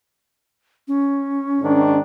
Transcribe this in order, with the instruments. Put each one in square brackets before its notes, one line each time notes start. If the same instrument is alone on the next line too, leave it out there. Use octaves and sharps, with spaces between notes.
[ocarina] C#4
[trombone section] G#2 D#3 D4